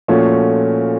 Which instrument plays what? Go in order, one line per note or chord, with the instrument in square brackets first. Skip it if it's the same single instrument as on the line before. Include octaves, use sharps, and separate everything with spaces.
[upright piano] A#2 F3 A3 C#4 F#4